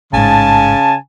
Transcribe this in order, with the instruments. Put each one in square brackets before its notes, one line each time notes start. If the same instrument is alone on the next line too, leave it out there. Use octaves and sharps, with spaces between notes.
[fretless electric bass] A1 G#2 [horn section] C#3 G#5 A5